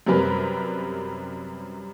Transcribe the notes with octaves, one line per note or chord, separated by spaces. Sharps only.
F#2 C3 G3 A#4 B4